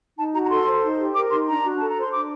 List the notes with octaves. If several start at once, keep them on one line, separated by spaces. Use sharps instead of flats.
D#4 A5
F#4 A#5
A#5
A4 C6
C5
D#4
G4
A#4 D6
D#4 C6
D4 A#5
F#4
A4 A5
A#5
C5 C6
D4 D6